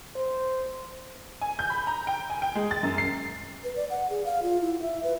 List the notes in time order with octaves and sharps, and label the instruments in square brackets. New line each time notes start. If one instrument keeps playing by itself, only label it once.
[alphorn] C5
[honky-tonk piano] G#5
G6
B5
A#5
G5
G#5
G5
G#3
A6
F#2
C7
[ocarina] B4
D5
F#5
G#4
F5
F4
E4
E5
B4